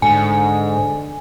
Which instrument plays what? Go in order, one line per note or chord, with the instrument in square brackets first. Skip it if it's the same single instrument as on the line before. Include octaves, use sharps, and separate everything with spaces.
[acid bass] G#2 [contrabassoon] D3 [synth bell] G#5